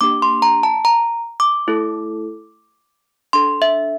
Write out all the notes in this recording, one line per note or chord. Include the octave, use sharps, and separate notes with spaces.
A#3 D4 G4 D6
C6
A#5
A5
A#5
D6
A3 E4 A4
D4 A4 C6
E5